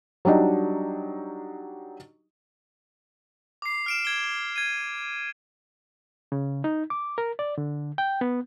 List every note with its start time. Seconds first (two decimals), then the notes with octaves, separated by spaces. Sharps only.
0.25 F#3 G3 D4 D#4
3.62 D6 C7
3.86 F6 D7 E7
4.05 G#6 G7
4.56 G#6 D#7
6.32 C#3
6.64 D#4
6.90 D6
7.18 A#4
7.39 D5
7.58 D3
7.98 G5
8.21 B3